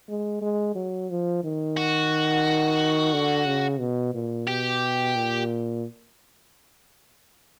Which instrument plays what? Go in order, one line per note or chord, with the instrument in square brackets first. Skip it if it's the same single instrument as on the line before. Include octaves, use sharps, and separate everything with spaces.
[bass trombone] G#3
G#3
F#3
F3
D#3
[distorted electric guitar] F#4
[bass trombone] D3
C#3
B2
A#2
[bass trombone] B2 [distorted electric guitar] G4
[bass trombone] A#2